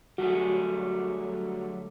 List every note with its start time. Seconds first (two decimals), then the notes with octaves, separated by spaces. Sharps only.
0.18 D3 F#3 G3 A3 F#4 G#4